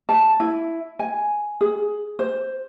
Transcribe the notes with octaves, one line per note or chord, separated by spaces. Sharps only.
A5
E4
G#5
G#4
C5